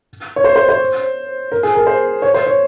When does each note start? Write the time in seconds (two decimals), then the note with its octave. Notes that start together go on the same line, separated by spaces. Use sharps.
0.36 C#5
0.44 C5
0.56 C5
0.69 C5
1.52 A#4
1.63 G#4
1.75 A#4
1.87 C5
2.22 C#5
2.34 C5
2.46 C#5